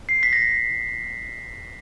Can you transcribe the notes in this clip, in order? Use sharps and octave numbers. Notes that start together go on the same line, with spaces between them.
C7
B6
A#6